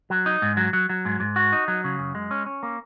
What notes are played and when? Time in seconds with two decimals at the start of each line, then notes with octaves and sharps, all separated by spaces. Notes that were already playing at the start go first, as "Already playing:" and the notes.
0.10 F#3
0.26 D#4
0.42 G#2
0.57 F#3
0.73 F#3
0.89 F#3
1.05 G#2
1.20 G#2
1.36 F#4
1.52 D#4
1.68 F#3
1.84 C#3
1.99 F#2
2.15 G#3
2.31 C#4
2.46 C#4
2.63 A#3